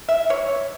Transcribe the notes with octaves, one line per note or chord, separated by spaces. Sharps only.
E5
C#5